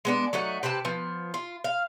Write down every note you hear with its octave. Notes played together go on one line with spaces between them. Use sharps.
G#3 B3 D4
F#3 A3 D#4 F#5
C3 B4 G5 A5
F3 B3
F4
F5